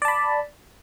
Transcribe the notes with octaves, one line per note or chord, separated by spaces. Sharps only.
D5 A5 B5